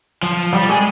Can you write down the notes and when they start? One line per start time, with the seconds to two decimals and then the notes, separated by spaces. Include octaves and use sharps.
0.23 F3
0.54 G3
0.69 G#3